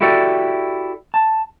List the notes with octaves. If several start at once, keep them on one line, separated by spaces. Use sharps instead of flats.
E4 F#4 G4 A4 D5
A5